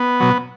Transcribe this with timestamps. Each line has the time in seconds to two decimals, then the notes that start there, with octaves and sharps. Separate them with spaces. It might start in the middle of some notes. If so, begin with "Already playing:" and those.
Already playing: B3
0.20 B2 F#3